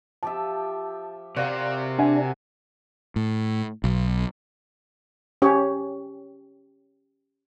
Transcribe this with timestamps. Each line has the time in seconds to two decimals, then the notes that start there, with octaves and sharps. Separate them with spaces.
0.23 F3 G4 E5 A5
1.37 C3 F#4 A#4 D5 F5
1.98 D4 E5 F#5 G#5
3.16 A2
3.84 B1
5.42 C#4 G4 C#5